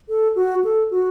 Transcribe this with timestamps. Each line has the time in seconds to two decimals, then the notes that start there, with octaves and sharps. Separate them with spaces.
0.09 A4
0.35 F#4
0.64 A4
0.91 F#4